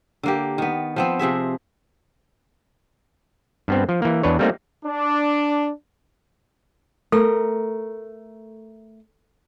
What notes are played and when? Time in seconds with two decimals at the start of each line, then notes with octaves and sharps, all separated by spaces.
0.23 D3 A#3 G4
0.58 D#3 B3
0.96 F3 B3 C4
1.19 C3 F3 G#4 E5
3.68 G2 B3 C4
3.89 F3
4.02 E3 A#3
4.23 E2 D4 B4 C#5
4.39 G3 A3 A#3 C4 D#4
4.85 D4
7.12 A3 A4 A#4